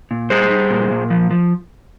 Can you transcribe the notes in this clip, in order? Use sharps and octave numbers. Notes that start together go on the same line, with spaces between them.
A#2
G3 G#4 C5
G3
A#2
A#2
F3
F3